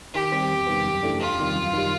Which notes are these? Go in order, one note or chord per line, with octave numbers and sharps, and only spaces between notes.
D#3 G4
G3 C4
E2
C3 D#3 G3 B3
F#2
C#3 E3 A3 D4
E2 F4
C3 D#3 G3
F#2
D#3 G3